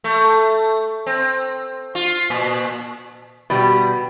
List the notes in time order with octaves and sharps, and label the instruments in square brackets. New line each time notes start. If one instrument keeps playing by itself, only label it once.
[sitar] A3
C4
F4
A#2
[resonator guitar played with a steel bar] B2 G3